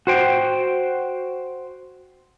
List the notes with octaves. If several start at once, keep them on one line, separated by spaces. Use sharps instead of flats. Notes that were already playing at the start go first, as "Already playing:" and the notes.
F#4 C5 G5